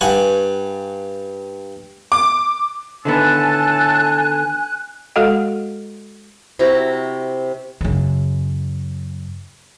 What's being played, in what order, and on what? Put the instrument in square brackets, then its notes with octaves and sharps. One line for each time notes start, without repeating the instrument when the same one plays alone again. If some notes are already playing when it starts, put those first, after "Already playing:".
[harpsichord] G2 F#5 G#5
[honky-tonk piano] D6
[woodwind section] A2 A4 A5 [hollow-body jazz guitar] D3 D#3 B3 [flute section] G#5 F#6
[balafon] G#3 F#4 A4 D#5 F5 F#5
[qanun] C3 E4 F#4 A#5
[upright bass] F#2 C#3